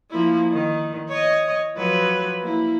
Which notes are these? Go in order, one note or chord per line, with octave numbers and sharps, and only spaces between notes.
F3 A#3 E4
D#3
C#5 D#5
F3 F#3 B4
A#3 E4